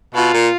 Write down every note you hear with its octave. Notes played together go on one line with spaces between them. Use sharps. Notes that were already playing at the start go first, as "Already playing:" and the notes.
B2 F4
A#2